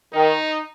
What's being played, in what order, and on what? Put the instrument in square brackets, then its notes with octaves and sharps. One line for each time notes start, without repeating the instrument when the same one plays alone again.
[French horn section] D#3 [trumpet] D#4